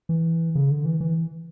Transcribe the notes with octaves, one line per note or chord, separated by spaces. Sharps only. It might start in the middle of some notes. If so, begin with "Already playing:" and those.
E3
C#3
D3
E3
E3